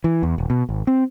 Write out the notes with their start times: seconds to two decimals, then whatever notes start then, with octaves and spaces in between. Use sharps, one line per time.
0.04 E3
0.23 E2
0.38 D#1
0.50 B2
0.69 G#1
0.87 C4